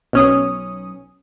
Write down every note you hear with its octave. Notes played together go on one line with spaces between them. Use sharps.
B1 C#4 D#6